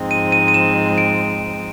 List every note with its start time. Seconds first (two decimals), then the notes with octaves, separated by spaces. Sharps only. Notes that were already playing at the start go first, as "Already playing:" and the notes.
Already playing: G#2 F3 G#3 C4 D#4
0.11 D#7
0.32 D#7
0.48 D#7
0.54 E7
0.98 D7